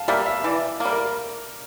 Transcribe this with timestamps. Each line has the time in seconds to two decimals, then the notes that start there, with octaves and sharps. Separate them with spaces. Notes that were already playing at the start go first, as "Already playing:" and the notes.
Already playing: F5 A5
0.08 G3 A#3 E5
0.26 E5
0.44 E3 D5
0.80 G3 A#3
0.92 A#4